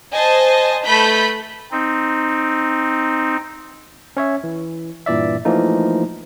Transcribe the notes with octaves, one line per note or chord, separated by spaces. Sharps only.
C5 D#5 G#5 A5
A3 B4 B5 G6 B6
C4 D#4
C#4 C#5 E5
E3
G2 A#2 E3 D5 E5
E3 F3 A3 A#3 D#4